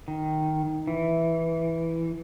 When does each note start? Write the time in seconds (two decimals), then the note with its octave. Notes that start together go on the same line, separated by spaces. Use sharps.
0.08 D#3
0.87 E3